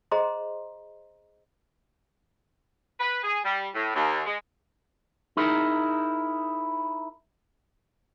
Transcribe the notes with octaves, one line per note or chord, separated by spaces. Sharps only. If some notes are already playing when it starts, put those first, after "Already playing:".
G#4 C5 D#5 A#5 C6
B4
G#4
G3
A2
D#2
G#3
D#4 E4 G#4 A#4